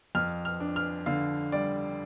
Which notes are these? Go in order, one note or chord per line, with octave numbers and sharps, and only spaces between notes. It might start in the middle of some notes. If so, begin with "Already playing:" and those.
F2 F6
F6
D4
F6
D3 F5
G3 D5